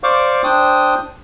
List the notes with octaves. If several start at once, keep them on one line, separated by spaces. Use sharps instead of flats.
C5 D5 F5 C#6 D6
D4 C5 G5 D#6